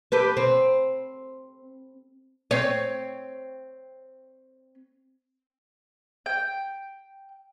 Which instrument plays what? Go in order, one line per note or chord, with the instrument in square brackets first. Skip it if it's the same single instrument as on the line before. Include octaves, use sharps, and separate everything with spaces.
[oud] G4 A4 B4
C4
C4 C#5
[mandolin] G5